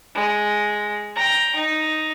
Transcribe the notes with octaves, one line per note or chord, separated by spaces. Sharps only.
G#3
G5 A#5
D#4